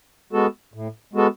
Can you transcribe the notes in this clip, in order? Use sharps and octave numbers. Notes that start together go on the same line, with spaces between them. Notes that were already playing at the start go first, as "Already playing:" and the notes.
G#3 B3 F#4 A4
A2
G#3 B3 F#4 A4